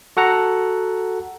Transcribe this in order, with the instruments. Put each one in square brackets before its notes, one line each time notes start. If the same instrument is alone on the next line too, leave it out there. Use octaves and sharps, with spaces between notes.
[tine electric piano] F#4 A4 F#5 A#5